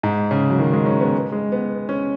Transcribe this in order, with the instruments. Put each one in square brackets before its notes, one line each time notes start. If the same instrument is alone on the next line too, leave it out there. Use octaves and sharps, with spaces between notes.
[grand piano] G#2
C#3
F#3
D#3
G#3
C#4
B3
G#3
B3
C#4